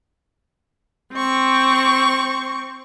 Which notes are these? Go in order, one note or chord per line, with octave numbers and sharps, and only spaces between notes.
C4 C#6